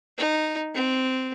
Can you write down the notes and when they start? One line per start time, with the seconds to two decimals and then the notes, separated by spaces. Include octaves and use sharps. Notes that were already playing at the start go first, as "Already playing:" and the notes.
0.18 D#4
0.74 C4